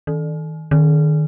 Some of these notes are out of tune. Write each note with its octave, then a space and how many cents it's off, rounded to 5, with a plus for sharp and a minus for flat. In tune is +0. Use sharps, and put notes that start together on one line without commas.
D#3 +25
D#3 -25